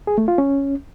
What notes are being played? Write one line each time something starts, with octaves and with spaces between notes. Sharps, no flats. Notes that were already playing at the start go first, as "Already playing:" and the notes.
G#4
A3
F4
C#4